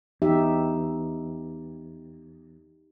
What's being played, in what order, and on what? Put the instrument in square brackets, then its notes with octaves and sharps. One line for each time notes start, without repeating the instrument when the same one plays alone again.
[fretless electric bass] E2 [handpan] D#4 G4 E5